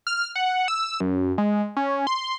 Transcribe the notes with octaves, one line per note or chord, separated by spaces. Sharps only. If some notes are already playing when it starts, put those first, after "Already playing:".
F6
F#5
E6
F#2
G#3
C#4
C6